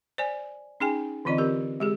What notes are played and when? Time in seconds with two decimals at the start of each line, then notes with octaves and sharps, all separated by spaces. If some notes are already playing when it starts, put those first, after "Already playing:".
0.18 C5 D5 G#5
0.80 C#4 D#4 G#4 G5 G#5
1.25 D3 E3 C4 F4 D5 D#5
1.38 C4 G4 A#4
1.80 G#3 G4 G#4